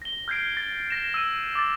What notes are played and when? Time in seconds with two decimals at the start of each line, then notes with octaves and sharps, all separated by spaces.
0.02 A#6 G7
0.28 F6 G6 G#6 C7 D7
0.57 A6 A#6
0.90 A#6 E7
1.14 E6 D#7
1.55 D6 A6